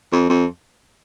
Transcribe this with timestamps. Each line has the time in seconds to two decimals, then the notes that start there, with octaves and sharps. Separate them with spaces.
0.12 F2
0.30 F2